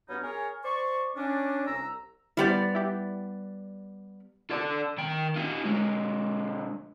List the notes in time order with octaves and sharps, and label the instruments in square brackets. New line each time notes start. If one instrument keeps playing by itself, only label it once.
[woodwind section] G2 F#3 B3 C#4 D#4 B5
G#4 A#4 C#5
C5 D5 C#6
C#4 D4
C2 A#5 E6
[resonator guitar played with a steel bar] G3 B3 D5 [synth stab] E4 G4 C5
[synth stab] E4 G4
[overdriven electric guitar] A4 D5
D#3 G5
D#4 F4
D3 G#3